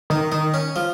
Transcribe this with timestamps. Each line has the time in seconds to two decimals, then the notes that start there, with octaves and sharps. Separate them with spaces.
0.10 D#3 D#4
0.32 D#3 D#4
0.54 C#4
0.76 F3